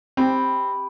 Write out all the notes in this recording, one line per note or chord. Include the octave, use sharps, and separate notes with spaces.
C4 G4 B5